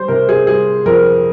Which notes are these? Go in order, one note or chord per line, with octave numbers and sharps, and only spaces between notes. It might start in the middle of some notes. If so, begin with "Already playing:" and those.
Already playing: G3 C5
C3 A#4
G#4
G3 G#4
F2 A#4